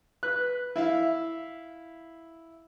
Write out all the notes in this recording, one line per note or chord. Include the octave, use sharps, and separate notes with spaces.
B4 F#6
E4 E5 F5